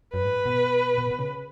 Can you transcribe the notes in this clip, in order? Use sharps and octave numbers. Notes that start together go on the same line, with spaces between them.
F#2 B4
G#2
B2
B2
B2
C#3